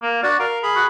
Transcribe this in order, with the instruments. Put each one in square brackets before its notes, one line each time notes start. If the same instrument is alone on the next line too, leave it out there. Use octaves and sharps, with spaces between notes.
[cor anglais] A#3
[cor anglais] D4 [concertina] F#4 D5
[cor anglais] A#4 [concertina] F5
[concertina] G#4 B5
[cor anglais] F#4